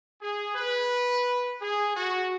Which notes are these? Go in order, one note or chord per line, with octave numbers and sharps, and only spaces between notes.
G#4
B4
G#4
F#4